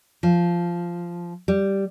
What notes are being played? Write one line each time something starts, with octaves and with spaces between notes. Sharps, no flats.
F3
G3